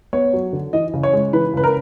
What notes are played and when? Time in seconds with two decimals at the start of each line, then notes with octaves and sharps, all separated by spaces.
0.13 B3 C#5
0.33 F#3
0.53 D3
0.73 E3 D#5
0.93 C#3
1.03 C#5
1.13 G#3
1.33 E3 B4
1.53 C#3 B4
1.64 A#4